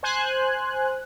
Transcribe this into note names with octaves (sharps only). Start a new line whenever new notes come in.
C5 G#5 F#6